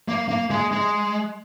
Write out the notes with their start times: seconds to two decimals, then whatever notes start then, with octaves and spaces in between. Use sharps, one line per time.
0.08 A#3
0.29 A#3
0.50 G#3
0.72 G#3